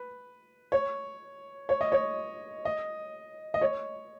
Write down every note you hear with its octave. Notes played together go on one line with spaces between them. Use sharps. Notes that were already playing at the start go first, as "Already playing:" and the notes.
Already playing: B4
C#5
C#5
D#5
C#5
D#5
D#5
C#5